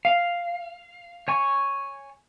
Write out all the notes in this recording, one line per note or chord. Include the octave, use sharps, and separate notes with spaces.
F5
C#5 G#5 C#6